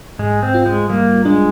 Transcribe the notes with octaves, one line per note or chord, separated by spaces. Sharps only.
G#2 G#3
C4
F4
G#3
G3 A#3
G#3 D4